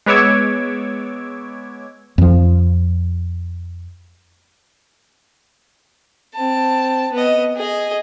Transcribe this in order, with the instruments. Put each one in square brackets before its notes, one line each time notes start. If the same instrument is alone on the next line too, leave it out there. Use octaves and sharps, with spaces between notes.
[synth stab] G#3 B3 C#5 D6 E6 G#6
[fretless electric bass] F2 F3
[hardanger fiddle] C4 A5
B3 D#5
G#4 D#5